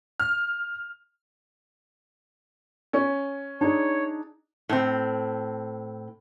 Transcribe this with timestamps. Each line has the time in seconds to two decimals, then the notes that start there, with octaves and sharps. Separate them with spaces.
0.20 F6
2.93 C#4
3.61 D4 D#4 G#4 C#5
4.69 A2 C4